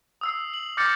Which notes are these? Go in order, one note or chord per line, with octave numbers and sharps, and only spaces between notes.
D#6 E6 C7
F#7
D6 F6 G6 A6 A#6 C#7